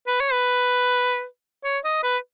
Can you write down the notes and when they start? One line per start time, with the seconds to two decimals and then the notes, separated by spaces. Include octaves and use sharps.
0.07 B4
0.20 C#5
0.33 B4
1.64 C#5
1.85 D#5
2.03 B4